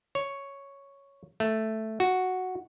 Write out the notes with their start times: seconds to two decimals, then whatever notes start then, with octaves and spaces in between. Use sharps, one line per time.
0.15 C#5
1.40 A3
2.00 F#4